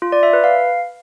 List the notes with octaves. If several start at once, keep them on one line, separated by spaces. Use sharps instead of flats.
F4
D5
E5
B4
F5